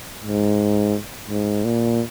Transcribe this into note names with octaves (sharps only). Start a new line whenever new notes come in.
G#2
G#2
A#2